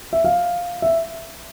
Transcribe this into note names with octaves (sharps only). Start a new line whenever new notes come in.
E5
F5
E5